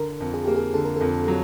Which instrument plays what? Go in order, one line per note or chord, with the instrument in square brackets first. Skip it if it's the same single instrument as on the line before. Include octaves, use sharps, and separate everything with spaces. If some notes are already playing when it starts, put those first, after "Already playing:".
Already playing: [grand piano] D3 [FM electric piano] A#4
[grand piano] F2
[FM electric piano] G#4
[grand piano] A#3 [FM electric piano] G4
[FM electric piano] G#4
[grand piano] D3 [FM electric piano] A4
[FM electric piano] A#4
A4
[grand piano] F2
[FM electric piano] A4
[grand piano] F#3